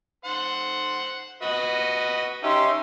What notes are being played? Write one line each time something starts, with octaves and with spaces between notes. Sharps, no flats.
C5 F#5
F#4 B4 D#5
C#4 D#4 G4 E5 C6